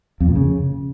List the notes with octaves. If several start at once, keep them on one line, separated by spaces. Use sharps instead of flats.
F2
A#2
C#3